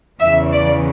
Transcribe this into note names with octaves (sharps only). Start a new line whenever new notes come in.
E2 C#3 E3 E5
D5